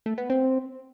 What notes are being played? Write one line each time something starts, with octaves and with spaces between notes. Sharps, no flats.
A3
B3
C4